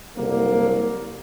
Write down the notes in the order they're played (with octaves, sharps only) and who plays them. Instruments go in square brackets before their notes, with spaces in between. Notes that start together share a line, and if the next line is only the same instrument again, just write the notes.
[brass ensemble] F#1 C2 D3 A#3